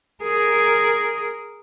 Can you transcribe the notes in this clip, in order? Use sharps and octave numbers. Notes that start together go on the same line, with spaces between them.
G#4 A#4